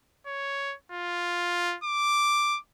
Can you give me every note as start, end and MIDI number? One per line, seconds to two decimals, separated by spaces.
0.27 0.75 73
0.92 1.76 65
1.84 2.59 86